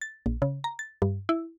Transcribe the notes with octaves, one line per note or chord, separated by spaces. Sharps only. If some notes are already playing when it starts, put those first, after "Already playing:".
A6
A#1
C#3
A#5
A6
G2
E4